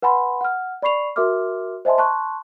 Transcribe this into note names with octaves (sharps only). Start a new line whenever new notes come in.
B4 F#5 G#5 B5 C6
F#5 F6
D5 B5 C#6 C7 F7
F#4 A#4 E5 C6 D6 F6
C5 D#5 E5 G#5 A5 C6
A5 C6 C#6 F#6